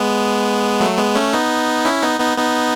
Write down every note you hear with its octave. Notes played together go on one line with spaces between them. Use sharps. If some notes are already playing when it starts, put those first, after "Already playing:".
Already playing: G#3 B3
F#3 A3
G#3 B3
A3 C#4
B3 D#4
C#4 E4
B3 D#4
B3 D#4
B3 D#4